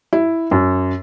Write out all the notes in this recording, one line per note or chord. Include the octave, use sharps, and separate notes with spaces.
E4
F#2